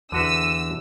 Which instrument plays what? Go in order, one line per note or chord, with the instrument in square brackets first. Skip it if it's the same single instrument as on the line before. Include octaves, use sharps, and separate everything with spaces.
[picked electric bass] E2 [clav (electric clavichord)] D3 F#4 B4 [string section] E6 [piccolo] D#7